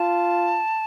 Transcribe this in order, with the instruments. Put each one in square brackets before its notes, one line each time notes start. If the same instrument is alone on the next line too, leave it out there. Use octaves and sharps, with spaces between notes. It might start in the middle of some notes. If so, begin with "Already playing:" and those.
Already playing: [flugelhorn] F4 [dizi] A5